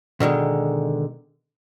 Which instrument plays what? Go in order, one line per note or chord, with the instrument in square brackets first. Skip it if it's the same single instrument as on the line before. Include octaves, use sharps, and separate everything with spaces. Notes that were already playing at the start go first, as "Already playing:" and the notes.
[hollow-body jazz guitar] B2 D3 D#3 G#3